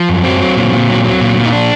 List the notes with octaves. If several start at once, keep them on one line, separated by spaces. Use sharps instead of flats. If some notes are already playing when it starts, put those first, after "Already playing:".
Already playing: F3
F#2
F#3 C4
F#3
A#2
A#2
F#3
F#3
A#2
A#2
D#4
D4